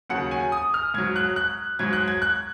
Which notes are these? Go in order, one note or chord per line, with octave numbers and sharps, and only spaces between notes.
D#2 C#3 F#3 F#5
G#5
D#6
F6
G#2 F#3 G#6
F#6
F#6
G#2 F#3 G#6
F#6
G#6
F#6